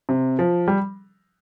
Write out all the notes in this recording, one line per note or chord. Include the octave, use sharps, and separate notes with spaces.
C3
F3
G3